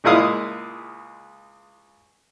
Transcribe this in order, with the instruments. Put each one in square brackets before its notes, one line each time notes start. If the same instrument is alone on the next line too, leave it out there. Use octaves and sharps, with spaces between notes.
[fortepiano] C#2 A#2 G#3 E4 F5 D#6